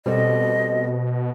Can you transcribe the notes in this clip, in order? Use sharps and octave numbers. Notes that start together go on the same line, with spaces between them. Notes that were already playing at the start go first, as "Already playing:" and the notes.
B2 G3 C4 A4 D#5